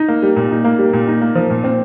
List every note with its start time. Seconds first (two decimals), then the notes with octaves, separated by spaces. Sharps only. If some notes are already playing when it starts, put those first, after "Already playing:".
Already playing: D#4
0.08 A#3
0.22 G3
0.36 A#2
0.51 D#4
0.64 A#3
0.78 G3
0.93 A#2
1.07 D#4
1.21 A#3
1.35 F3
1.50 A#2
1.64 C4